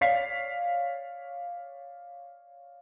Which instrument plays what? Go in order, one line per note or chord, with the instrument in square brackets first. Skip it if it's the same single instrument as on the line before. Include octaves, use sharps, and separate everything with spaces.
[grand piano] C#5 D5 F5 B6 C7